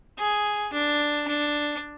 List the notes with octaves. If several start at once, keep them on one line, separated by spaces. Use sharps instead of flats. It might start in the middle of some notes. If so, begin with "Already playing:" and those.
G#4
D4
D4